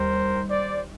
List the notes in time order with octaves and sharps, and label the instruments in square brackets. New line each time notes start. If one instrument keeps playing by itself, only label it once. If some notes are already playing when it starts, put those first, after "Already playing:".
Already playing: [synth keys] D#2 D#3 G3 [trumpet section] A#4 C5
[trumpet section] C5 D5